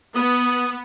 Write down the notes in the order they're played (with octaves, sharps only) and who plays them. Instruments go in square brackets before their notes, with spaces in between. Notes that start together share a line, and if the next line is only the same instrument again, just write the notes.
[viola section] B3 [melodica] D#6